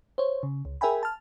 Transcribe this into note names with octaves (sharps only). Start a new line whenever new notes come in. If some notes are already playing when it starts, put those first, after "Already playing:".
C5 C#5
C#3
C#2
G#4 A#4 E5 G5 G#5 B5
A5 F6